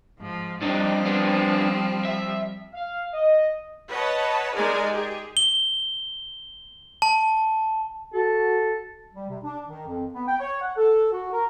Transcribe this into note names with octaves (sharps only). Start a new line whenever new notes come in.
G#2 F3
F3 G3 C4 D4 D#4
B3 D4
E5
F5
D#5
B4 C#5 D#5 F#5 A5
G#3 D#4 G#4 A#4 D5 G#5
G4 G#4
G7
A5
F#4 A4
G3
C3
D4
D#3
F2
B3
G5
C#5
F#5
A4
F#4
A#4